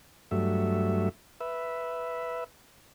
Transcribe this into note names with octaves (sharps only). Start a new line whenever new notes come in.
G2 F#3 A3 E5
B4 E5